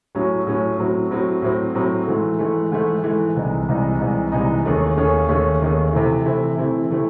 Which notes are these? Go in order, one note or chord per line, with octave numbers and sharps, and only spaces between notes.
A2 F#3 C#4
A2 F#3 C#4
A2 F#3 C4
A2 F#3 C4
A2 F#3 C4
A2 F#3 C4
G#2 E3 A3
G#2 E3 A3
G#2 E3 A3
G#2 E3 A3
C2 C3 E3 G#3 D#4
C2 C3 E3 G#3 D#4
C2 C3 E3 G#3 D#4
C2 C3 E3 G#3 D#4
D#2 D#3 A3 C#4 G#4
D#2 D#3 A3 C#4 G#4
D#2 D#3 A3 C#4 G#4
D#2 D#3 A3 C#4 G#4
C3 E3 A3 C4 E4
C3 E3 A3 C4 E4
C3 E3 A3 C4 E4
C3 E3 A3 C4 E4